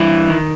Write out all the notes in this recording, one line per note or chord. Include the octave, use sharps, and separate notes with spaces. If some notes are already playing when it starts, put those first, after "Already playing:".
Already playing: G2 E3 E4
D#3